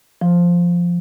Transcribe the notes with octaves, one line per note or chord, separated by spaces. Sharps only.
F3